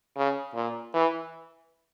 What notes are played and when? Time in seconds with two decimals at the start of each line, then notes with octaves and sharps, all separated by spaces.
0.17 C#3
0.55 A#2
0.94 E3